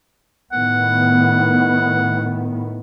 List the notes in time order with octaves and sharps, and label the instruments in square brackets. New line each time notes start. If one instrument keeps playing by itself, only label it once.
[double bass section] A2 D#3 B3 [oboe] F#5